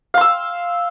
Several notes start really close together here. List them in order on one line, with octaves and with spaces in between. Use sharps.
F5 C6 E6